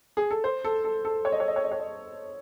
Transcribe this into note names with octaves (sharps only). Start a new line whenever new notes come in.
G#4
A4
C5
A4
A4
A4
C#5
D#5
C#5
D#5
C#5
D#5
C#5
D#5